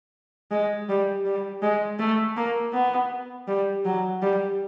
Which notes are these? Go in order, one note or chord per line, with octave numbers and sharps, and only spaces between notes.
G#3
G3
G3
G#3
A3
A#3
B3
G3
F#3
G3